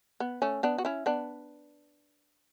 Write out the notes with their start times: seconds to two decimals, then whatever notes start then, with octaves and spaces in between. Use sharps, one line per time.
0.20 B3
0.42 A3 C#4
0.63 B3 D4
0.78 F#4
0.85 C#4 E4
1.06 B3 D4